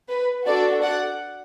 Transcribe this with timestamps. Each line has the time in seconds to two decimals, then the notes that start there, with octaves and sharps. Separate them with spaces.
0.10 B4
0.46 D4 F#4 A4 D5
0.82 D5 F#5